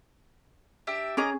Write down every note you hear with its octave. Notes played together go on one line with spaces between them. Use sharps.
D4 G4 E5
C#4 G#4 D#5 A#5 D6